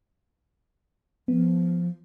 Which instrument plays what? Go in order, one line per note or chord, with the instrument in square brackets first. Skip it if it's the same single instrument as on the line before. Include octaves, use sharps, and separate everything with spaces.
[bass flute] F3 [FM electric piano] B3